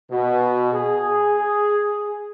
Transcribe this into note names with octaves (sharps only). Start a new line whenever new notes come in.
B2
G#4